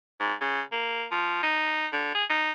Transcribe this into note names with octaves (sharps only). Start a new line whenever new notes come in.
G#2
C#3
A#3
F3
D#4
D3
G#4
D#4